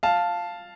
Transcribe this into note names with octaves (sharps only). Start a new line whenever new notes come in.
F5 A5